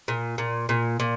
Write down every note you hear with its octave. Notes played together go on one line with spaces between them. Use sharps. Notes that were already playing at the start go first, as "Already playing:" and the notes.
A#2
A#2
A#2
A#2